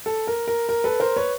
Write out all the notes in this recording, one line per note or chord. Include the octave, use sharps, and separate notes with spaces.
A4
A#4
A#4
A#4
A4 B4
A#4 C5
B4 C#5